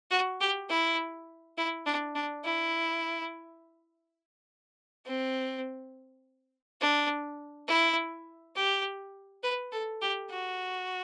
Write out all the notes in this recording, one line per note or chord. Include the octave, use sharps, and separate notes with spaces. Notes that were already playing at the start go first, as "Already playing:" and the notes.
F#4
G4
E4
E4
D4
D4
E4
C4
D4
E4
G4
B4
A4
G4
F#4